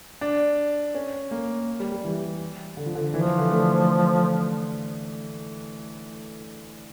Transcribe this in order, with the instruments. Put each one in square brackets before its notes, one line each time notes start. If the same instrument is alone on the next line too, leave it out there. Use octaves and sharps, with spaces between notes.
[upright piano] D4
C#4
A#3
G3
G3
E3
D3
F3
D3
[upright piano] E3 [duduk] F3
[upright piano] E3
D3
A3